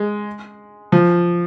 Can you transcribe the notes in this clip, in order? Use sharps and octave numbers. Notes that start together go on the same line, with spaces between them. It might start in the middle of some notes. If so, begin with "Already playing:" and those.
Already playing: G#3
F3